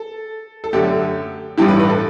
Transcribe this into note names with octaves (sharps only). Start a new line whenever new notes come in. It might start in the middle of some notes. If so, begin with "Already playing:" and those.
Already playing: A4
A4
F#2 D3 A3 G4
A1 G2 E3 G4
B4
B4
A4